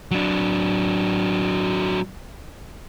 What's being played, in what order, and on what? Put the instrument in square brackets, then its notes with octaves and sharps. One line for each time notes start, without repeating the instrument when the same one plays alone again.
[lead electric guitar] F#3 D4